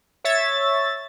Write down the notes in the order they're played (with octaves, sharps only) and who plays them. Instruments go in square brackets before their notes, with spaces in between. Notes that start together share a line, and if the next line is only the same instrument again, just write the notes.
[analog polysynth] C#5 E5 A6